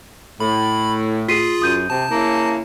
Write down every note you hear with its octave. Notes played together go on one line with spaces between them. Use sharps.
A2 B5
F4 G#4 B6 C7 D#7
F#2 D#6 G6 D#7
C3 A5
C#3 A#3 E4